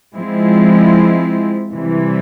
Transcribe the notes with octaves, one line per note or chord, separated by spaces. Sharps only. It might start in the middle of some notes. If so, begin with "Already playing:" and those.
F3 G#3 C4 E4
C3 E3 G3